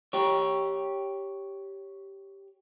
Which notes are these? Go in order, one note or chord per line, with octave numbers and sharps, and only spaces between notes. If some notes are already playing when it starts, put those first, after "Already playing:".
G4 C#5